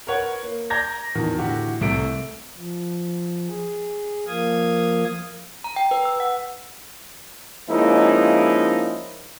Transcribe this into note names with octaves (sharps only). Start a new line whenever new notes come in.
A#4 B4 C#5 F#5
A#3
D5 A#5 G6 G#6 A#6
E2 B2 D#3
A2 D3 E3 F#4 G4
C2 C3 A3 D7
F3
G#4
F3 A#3 F5 D#6 G#6
A#5
G5
B4
E6
F#5
F3 G#3 A#3 C#4 D#4 E4